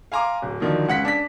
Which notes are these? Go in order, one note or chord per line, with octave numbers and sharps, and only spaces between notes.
F5 G#5 A#5 C6 D6
D1
D3 D#3 F3 F#3
C#2 F#5 B6
D4 B6